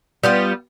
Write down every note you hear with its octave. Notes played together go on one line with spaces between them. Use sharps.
G3 B3 F4